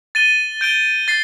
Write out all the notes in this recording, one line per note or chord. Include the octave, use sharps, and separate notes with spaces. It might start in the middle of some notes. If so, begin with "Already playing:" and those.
A6 D#7 G7
G6 D7 G7
A6 C7